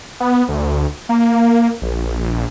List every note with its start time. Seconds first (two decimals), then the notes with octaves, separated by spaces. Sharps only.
0.20 B3
0.49 D2
1.09 A#3
1.82 A#1